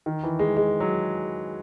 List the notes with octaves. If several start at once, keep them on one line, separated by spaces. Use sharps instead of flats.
D#3
E3
G#3
G#3
F#3